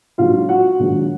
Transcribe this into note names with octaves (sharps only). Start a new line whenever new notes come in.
A#1 G#2 F#3 F4 F5
F#4 F#5
A#1 G#2 D#3 F#3